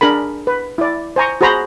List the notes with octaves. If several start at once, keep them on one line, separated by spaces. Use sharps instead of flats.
D4 G#4 A#4 B5
B4
E4 D5
C5 G#5 A#5 C#6
F#4 G#4 C5 A#5 B5